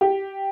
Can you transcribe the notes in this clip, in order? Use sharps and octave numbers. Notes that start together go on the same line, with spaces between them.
G4